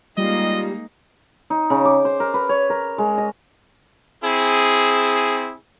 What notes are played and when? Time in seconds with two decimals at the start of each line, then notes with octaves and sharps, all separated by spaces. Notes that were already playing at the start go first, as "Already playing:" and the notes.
0.17 G3 G#3 A#3 D#4 F4 D#5
1.50 D#4
1.70 C#3
1.85 D6
2.05 C5
2.20 A#4
2.34 B4
2.49 C#5
2.70 A#4
2.98 G#3
3.18 D#5
4.24 C4 E4 G#4